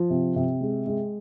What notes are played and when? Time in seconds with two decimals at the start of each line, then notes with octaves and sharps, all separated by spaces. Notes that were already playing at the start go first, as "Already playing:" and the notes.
Already playing: F3
0.10 C3
0.36 C3
0.61 G#3
0.86 G#3